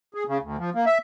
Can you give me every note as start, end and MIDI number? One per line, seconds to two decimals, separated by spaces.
0.14 0.24 68
0.28 0.38 49
0.42 0.57 38
0.58 0.70 53
0.74 0.85 58
0.86 0.98 76